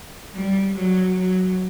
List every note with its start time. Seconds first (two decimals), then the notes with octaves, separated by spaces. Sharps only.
0.34 G3
0.75 F#3
1.16 F#3